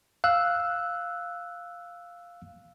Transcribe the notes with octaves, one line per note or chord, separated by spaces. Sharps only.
F5 E6 F#6